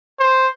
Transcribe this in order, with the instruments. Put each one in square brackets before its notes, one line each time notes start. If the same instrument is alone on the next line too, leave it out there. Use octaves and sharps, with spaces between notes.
[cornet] C5